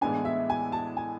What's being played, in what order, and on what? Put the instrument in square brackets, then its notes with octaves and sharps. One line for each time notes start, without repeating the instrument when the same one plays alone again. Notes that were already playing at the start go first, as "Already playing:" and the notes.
[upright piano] A2 E3 G#3 B3 D4 [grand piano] G#5
[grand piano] E5
G#5
A5
G#5